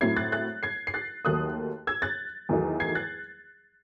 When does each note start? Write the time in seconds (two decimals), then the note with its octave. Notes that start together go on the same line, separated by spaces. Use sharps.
0.01 A2 F#3 C4 E4 G#6 C7
0.16 F#6 A6
0.32 F#6 A6
0.63 G#6 C7
0.87 C7
0.94 F#6 A6
1.25 D#2 D#3 F#3 A3 D#6 F#6
1.87 E6 G#6
2.02 F#6 A6
2.49 E2 D#3 F#3 A3 D#4
2.80 G#6 C7
2.95 F#6 A6